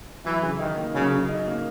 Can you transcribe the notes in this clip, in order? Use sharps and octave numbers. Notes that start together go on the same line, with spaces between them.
E3 F#3
C#3
D#3 D#4
A#3
C#3 F#3
C#3
D#4
A#3